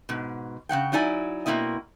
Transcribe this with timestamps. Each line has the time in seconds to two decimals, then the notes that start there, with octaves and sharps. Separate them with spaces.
0.09 G#2 B2
0.69 C#3 A#3 F#5 G5
0.92 F#3 D#4 E4 D5 G#5
1.46 B2 A#3 C4 E4 D#5